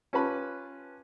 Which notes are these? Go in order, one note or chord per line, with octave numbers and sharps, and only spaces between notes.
C#4 F4 G4 B4 A5 B5